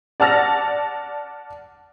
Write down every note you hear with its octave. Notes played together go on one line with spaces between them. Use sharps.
D5 F#5 A5 F6 A6 A#6